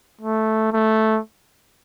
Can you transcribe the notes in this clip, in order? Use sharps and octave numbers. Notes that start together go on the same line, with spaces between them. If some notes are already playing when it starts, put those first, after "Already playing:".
A3
A3